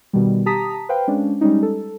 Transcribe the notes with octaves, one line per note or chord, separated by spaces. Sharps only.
B2 D#3 G3
G4 A5 A#5 D#6 B6
B4 C5 F5 G5
G#3 C#4 D4
G3 G#3 C#4 D#4
A4